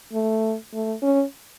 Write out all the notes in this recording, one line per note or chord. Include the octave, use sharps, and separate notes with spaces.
A3
A3
C#4